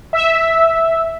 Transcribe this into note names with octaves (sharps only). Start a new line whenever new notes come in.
E5